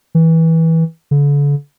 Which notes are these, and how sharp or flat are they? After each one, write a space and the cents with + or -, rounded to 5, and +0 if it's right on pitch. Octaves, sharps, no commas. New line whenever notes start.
E3 -20
D3 -40